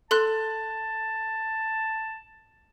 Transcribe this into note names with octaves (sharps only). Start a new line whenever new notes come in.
A4 A5 C6 F#6